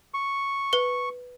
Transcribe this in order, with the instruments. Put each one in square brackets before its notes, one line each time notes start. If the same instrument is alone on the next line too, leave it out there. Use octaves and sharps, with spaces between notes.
[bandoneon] C#6
[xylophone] B4 G7